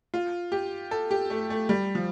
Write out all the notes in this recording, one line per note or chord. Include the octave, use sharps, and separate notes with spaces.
F4
G4
A4
G4
A3
A3
G3
F3